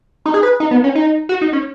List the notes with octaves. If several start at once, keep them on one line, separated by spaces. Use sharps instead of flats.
D#4
G#4
B4
D#4
B3
C#4
D#4
F#4
D#4
C#4